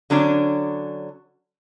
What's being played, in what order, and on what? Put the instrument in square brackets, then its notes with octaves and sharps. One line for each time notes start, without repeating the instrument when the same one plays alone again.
[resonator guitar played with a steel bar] D3 F#3 C#4 D4